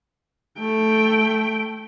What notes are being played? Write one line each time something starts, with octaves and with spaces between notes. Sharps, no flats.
A3 G5